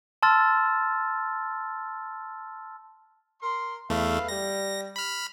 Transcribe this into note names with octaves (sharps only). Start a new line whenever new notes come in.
A5 C6 E6 F6 A6
A#4 C6
E2 A3 B4 E5 F5
G3 A#6
B5 F6